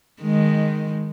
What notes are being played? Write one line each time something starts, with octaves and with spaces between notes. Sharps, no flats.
D#3 G#3